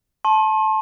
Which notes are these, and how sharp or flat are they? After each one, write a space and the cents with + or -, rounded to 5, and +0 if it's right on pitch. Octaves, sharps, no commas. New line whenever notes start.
A5 -15 C6 +40